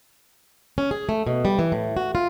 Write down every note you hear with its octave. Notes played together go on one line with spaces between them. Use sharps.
C#4
G#4
A3
B2
G3
E3
A2
F#4
F4